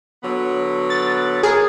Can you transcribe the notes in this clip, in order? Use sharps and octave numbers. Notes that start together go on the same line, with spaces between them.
D3 F#3 B3
A6
G#4 A#4